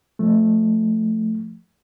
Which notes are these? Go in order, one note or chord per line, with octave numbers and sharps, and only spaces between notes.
F3 A3